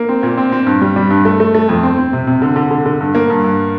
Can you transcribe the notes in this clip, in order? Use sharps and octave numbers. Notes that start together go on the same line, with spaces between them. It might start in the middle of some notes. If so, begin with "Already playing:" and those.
Already playing: A#3
C4
A#2
C4
C4
G2
G3
G3
G2
A3
A3
A3
F2
C4
C4
C3
C3
D3
D3
D3
D3
G2
A#3
G2
G2